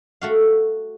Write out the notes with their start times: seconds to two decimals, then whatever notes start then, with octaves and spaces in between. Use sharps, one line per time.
0.21 A3 F#4 F5